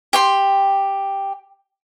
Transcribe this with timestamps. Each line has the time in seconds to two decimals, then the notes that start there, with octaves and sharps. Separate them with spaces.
0.13 G4 G5 C6